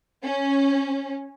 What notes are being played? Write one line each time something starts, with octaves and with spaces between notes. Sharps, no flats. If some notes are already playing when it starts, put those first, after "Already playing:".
C#4